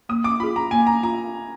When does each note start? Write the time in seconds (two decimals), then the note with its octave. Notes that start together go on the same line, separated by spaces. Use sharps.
0.09 A#3 D#6
0.24 D6
0.40 F4 G#4 B5
0.56 A#5
0.71 A#3 G#5
0.87 A#5
1.03 F4 A#5